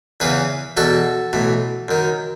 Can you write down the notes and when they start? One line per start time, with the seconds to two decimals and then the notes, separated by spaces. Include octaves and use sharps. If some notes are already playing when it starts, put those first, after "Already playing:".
0.20 E2 C#3 E3 G#4 B4
0.77 E2 B2 F#4 A4
1.33 B1 A2 E3
1.88 F#2 D#3